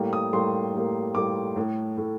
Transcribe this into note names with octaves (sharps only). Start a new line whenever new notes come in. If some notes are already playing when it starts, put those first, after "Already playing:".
Already playing: A2 G3 A#3
D#6
A2 G3 A#3 C6
A2 G3 A#3
A2 G3 A#3 D6
A2 A3
A2 A3